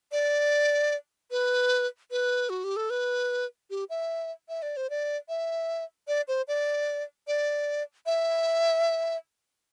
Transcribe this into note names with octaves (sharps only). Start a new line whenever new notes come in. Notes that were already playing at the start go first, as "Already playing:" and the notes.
D5
B4
B4
F#4
G4
A4
B4
G4
E5
E5
D5
C5
D5
E5
D5
C5
D5
D5
E5